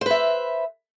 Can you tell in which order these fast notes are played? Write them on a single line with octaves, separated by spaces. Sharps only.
C5 B4 E5